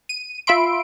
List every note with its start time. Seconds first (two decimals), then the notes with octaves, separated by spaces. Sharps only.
0.09 D#7
0.47 F4 E5 B5 C6 D7